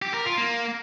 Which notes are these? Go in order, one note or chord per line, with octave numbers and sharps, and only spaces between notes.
G4
A#4
F4
A#3